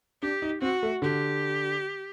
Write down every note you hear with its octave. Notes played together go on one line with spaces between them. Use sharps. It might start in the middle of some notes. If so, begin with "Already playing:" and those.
D4 G4
D#4
C4 F#4
A3
D3 G4